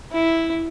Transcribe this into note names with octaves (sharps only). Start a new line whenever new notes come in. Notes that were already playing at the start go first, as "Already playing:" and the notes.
E4